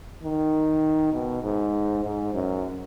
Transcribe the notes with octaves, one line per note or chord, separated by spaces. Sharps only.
D#3
B2
G#2
G#2
F#2